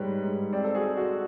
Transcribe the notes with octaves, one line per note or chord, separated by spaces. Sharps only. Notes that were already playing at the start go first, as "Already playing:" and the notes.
Already playing: G#2 G3 B4 C#5
G#2
C4 C5 D5
A4
F#4 G#4
G#3
F#4